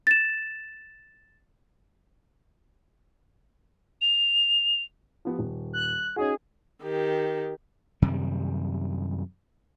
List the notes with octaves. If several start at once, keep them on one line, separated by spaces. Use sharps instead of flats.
A6 E7
F7
F3 B3 G4
D#1
F#6
C#4 D#4 F#4 G#4
D#3 G4
F#2 C3 D#3 G3